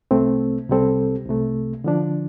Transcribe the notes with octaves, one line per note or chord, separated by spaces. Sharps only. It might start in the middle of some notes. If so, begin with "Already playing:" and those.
C2 C3 A3 C4
C2 C3 G3 C4 A4
C2 C3 A3
D3 F3 D4